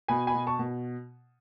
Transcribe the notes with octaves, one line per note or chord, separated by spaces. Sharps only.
B2 G#5 B5
G#5 B5
B2
A5 C#6
B2